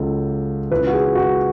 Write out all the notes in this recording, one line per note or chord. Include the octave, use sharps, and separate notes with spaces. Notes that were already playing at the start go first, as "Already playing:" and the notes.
Already playing: C#2 C#3 F#3 A4
C#2 C#3 E3 B4
F#4
G#4
F#4